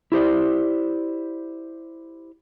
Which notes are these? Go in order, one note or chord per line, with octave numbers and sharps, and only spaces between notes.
E4 G4 C5 D5